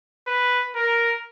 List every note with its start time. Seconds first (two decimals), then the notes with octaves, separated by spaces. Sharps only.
0.28 B4
0.76 A#4